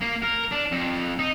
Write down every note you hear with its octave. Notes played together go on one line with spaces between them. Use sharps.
A#3
A#4
D4
F2
D#4